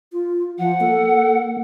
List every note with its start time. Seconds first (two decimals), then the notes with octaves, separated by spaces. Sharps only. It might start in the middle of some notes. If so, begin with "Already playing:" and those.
0.13 F4
0.59 F3 F#5
0.81 A#3 A4